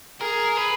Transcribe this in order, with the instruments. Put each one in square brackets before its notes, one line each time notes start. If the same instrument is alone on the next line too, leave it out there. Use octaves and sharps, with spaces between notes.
[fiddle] G#4 [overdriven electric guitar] A#4
[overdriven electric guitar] B4